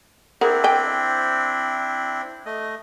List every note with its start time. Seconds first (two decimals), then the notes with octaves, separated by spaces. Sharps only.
0.41 C4 D4 E4 G#4 A#4 F#5
0.64 G5 G#5
2.46 A3 D#5